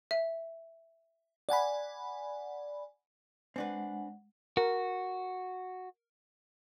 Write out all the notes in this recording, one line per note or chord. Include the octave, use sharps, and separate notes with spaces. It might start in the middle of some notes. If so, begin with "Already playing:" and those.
E5
D5 F#5 G#5 B5
G#3 C4 D4 B4 F#5
F#4 A#4